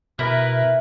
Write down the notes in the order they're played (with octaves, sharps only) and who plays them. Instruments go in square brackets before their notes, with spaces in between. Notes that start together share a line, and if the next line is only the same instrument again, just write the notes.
[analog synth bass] B2 [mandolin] E4 [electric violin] A#4 B4